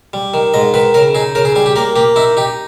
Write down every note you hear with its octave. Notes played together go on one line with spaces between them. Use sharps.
G3
D#3
G#2 D#5
D#3 B4
C#3 A#4
D#4 G#4
C#3 A#4
G#4
G3 G#4
G4
A#3 A#4
A#3 G4
D#4 E4
D#4 G4